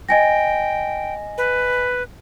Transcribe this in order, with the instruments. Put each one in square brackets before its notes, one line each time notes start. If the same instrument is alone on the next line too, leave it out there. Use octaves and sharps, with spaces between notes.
[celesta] D#5 G#5 A#6 [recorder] G5
[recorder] B4